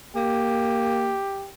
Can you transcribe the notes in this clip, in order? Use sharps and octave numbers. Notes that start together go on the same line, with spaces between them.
A#3 G4